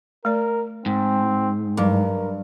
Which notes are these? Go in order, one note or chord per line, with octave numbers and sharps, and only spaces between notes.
A3 A#4 D5
G#2 C4
G2 F#3 G3 A#4